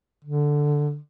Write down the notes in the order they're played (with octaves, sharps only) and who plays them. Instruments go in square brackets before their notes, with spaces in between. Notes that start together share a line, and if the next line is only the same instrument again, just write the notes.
[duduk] D3